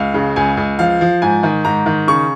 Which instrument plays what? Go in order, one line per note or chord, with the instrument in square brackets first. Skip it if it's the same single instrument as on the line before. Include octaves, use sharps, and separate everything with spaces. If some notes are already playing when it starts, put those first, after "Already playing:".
Already playing: [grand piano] C#2 F5
C#3
C#2 G#5
C#2
F3 F5
F3
G#2 G#5
D#3
G#2 A#5
D#3
C#3 C#6